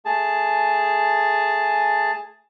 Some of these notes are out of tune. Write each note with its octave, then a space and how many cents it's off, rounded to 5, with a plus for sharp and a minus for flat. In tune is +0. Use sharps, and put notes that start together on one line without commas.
A3 +0 G#4 +0 A5 +0